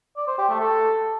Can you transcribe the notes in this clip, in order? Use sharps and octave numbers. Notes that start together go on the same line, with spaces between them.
D5
C5
G4
A3
A4